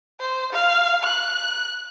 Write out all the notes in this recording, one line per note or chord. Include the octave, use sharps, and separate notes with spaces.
C5
F5
F#6